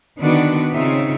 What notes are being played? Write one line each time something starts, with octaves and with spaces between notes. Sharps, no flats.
D3 D#3 B3 D4 F#4 B4
C#3 C4 D#4 F4 C#5 E5